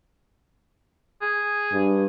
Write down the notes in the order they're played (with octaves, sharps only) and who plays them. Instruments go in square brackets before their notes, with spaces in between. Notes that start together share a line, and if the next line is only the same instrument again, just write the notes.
[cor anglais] G#4
[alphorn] G2